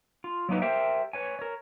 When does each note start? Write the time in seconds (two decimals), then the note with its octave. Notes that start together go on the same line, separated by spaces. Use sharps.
0.24 F4
0.49 F#3 A#3 D#4 B4
0.62 G4 A#4 C5 E5 G5
1.13 B4 C#5 G#5
1.39 A#4 C#5